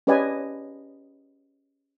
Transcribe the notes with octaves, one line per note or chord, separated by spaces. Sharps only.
C#4 G4 B4 D5 D#5 G#5